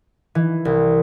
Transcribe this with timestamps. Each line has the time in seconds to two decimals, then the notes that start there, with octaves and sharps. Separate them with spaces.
0.35 E3
0.65 C2